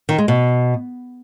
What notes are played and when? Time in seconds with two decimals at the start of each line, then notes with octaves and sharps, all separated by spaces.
0.09 D#3
0.18 G#3
0.28 B2